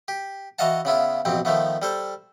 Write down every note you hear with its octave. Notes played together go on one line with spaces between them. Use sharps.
G4
E3 F#4 D#5 F5 F#5 A5
C#3 B3 E4 F4
A1 F2 B2 C4
D#3 F3 A3 B3
G3 A4 C5